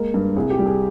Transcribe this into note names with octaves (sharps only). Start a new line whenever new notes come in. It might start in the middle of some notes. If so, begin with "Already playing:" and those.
Already playing: G#3 A#3 A#4
G2
C2 G#4
G4
G3
G#4